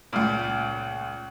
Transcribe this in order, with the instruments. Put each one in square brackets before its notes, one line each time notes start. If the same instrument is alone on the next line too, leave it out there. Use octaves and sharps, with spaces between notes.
[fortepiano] C#2 A#2